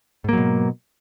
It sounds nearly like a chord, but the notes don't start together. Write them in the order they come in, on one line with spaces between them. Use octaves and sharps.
G#2 A#3 F#3 B2